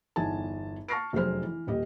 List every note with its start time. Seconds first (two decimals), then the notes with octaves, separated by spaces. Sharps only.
0.16 G1 E2 D#4 G#5 A5
0.88 A5 C#6 F6 A#6 C7 D7
1.13 F1 F#2 G#4 C5 F6
1.43 E3
1.67 D#1 G4 D#5